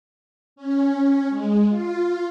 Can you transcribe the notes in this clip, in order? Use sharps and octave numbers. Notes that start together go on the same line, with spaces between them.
C#4
G#3
F4